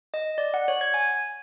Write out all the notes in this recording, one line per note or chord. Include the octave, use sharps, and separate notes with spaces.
D#5
D5
F#5
C#5
G#6
G#5